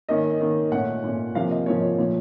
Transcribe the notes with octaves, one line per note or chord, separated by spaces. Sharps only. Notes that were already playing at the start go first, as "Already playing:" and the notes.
D#3 A#3 C#4 D#5
D#3 A#3 C#4
A#2 A3 C#4 F#5
A#2 A3 C#4
C3 F3 A#3 C#4 F5
D#5
C3 F3 A#3 C#4 C#5
C#5
A#2 F3 A3 C#5